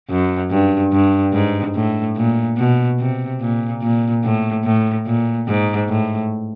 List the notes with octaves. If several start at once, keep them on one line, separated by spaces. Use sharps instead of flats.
F#2
G2
G2
G#2
A2
A#2
B2
C3
A#2
A#2
A2
A2
A#2
G#2
A2